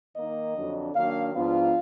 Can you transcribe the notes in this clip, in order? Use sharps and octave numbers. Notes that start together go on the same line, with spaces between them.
D#3 A#3 D#4 D#5
F2 D3 F#3 D4
D#3 F#3 A#3 D4 F5
G#2 F3 B3 D4 F4 F5